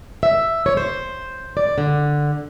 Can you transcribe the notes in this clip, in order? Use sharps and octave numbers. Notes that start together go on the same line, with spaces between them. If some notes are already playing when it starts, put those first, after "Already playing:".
E5
C#5
C5
D5
D3